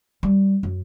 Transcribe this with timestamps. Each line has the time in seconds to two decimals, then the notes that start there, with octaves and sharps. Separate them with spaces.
0.23 G3
0.63 F#2